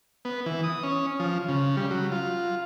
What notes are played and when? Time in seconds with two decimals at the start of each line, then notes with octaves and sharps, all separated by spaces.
0.25 B3
0.46 E3
0.64 D#6
0.83 C#4
1.20 F3
1.48 C#3
1.77 G3
1.91 F#3
2.12 F4